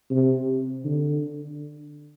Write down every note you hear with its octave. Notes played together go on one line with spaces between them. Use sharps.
C3
D3